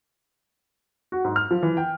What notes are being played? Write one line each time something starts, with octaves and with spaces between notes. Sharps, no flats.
F#4
G#2
F6
F3
E3
G5